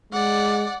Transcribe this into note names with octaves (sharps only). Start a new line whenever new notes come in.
G#3 D5 F#5